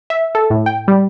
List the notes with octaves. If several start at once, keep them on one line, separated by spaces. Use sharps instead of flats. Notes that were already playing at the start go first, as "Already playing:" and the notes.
E5
A4
A2
G5
G3